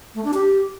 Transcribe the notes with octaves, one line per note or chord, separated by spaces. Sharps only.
A3
D4
G4